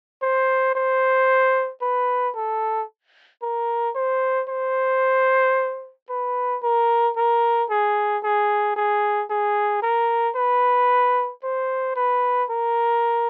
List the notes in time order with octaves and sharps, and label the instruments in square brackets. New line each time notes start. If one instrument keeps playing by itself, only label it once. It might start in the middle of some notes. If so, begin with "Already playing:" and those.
[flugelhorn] C5
C5
B4
A4
A#4
C5
C5
B4
A#4
A#4
G#4
G#4
G#4
G#4
A#4
B4
C5
B4
A#4